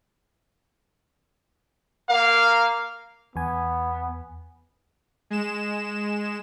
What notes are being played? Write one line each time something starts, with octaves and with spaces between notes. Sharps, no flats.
A#3 A#4 F5
E2 B3 G#5
G#3 E7